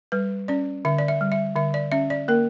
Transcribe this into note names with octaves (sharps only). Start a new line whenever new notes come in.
G3 B4
C#4 D5
D3 E5
D5
E5
G3
E5
D3 E5
D5
C#4 E5
D5
A#3 A#4